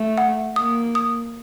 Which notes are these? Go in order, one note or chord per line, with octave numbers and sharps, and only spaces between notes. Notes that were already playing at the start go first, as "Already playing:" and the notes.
Already playing: A3
F#5
A#3 D#6
D#6